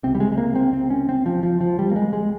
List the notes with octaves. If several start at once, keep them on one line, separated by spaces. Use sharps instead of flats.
C#2 C3 C4
G3
G#3
G#3
A#3
C4
C4
C#4
C4
F3
F3
F3
G3
A#3
G#3
G#3